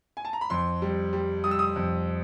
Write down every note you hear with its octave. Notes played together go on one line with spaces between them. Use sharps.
G#5
A5
A#5
B5
F2 C6
G3
G3
G3 D#6
E6
D#6
F2